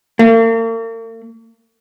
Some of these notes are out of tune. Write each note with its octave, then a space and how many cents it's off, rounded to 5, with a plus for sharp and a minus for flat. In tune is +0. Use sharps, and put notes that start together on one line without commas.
A#3 -45